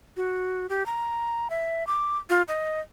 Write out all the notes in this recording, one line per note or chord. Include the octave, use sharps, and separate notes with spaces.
F#4
G4
A#5
E5
D6
F4
D#5